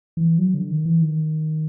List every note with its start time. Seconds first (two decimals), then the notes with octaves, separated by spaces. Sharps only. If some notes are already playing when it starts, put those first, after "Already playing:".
0.17 E3
0.38 F#3
0.54 D3
0.71 D#3
0.85 E3
1.01 D#3